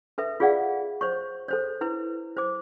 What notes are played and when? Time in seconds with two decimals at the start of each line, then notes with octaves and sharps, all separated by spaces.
0.18 A4 B4 E5
0.40 F4 G#4 D5 F5 F#5
1.01 C5 C#5 C#6
1.48 A4 C5 C#5
1.81 E4 B4
2.37 C5 D6